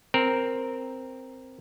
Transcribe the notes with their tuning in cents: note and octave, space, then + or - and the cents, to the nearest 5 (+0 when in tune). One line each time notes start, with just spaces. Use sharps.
C4 +0 A#4 +0